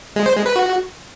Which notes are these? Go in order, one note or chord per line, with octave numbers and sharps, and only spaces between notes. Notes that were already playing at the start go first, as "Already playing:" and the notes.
G#3
C5
G#3
B4
F#4